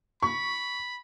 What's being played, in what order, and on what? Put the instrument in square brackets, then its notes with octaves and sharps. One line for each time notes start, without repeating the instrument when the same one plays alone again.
[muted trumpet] B5 [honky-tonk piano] C#6